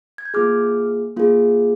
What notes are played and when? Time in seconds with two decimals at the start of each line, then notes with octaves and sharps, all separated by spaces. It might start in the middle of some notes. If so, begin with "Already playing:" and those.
0.18 G#6
0.25 G6
0.34 A#3 F4 G#4 D6 F6
1.17 A#3 F4 G#4